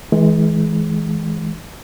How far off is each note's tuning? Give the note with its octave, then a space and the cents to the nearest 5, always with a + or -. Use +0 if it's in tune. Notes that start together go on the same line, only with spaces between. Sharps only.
E3 -25 G#3 +20